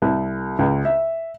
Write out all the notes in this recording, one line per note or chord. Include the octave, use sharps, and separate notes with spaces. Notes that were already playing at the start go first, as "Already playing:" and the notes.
C2
C#2
E5